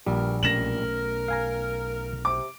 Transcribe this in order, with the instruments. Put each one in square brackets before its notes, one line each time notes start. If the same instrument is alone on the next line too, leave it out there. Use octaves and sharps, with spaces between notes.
[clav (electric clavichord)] A#1 G3 [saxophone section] E3 A#4
[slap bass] B1 A3 C#4 [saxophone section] A#4 [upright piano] A#6 E7 F#7
[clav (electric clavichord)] F5 G#5 A#5
[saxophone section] C3 [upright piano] D6